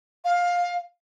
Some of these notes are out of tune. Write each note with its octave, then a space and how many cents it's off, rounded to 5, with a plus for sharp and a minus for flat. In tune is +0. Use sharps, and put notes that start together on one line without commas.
F5 +15